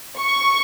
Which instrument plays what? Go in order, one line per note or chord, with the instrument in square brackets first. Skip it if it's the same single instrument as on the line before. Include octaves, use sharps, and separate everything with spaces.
[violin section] C#6